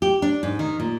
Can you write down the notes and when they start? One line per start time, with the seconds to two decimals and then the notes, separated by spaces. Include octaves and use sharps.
0.02 G4
0.22 D4
0.43 G#2
0.59 D#3
0.80 A#2